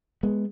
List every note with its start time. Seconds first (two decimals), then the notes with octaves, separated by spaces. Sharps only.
0.23 G#3 B3